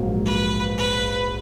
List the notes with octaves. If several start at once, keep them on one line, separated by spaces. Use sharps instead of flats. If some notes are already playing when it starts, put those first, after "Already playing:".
Already playing: A#1 G#2 F#3 A#3
B4
B4